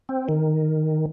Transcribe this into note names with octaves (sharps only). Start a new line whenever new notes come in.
C4
D#3